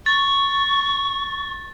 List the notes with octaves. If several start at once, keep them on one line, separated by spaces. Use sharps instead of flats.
C#6 A6